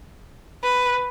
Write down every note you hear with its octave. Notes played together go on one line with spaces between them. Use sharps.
B4